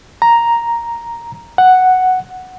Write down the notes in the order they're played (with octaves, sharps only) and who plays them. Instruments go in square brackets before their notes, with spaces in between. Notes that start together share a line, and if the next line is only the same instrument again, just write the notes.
[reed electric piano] A#5
F#5